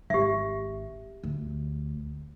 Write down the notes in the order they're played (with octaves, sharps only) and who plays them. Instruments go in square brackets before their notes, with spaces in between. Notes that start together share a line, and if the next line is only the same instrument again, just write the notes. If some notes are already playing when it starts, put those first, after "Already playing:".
[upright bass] G#1 [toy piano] G4 E5
[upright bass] D2